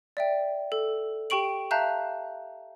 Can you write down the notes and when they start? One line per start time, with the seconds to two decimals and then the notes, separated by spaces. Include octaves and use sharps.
0.17 D5 E5 G5
0.72 A4
1.30 G4 G5 C#6 D7 F#7
1.71 E5 F5 A5 A#5 F#6 G6